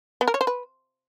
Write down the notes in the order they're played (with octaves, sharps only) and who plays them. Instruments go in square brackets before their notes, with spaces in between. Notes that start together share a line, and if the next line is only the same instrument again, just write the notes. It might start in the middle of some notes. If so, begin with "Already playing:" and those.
[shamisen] B3
A#4
C#5
C5
B4